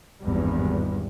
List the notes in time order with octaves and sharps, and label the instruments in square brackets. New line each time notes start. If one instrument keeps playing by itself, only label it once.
[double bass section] G#1 E2 G2